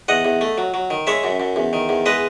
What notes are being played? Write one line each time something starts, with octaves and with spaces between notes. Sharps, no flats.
E2 D#5 F#5
E2
A3
F#3
F#3
D#3
G#3 C#5 E5
F#2
F#2
E2
D#3
E2
G#3 B4 D#5